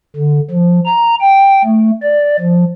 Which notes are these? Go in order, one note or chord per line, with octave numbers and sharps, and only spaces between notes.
D3
F3
A#5
G5
A3
D5
F3